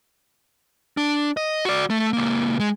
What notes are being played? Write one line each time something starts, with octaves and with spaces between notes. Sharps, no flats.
D4
D#5
F#4 D5
A3
C#2 A#3
G#3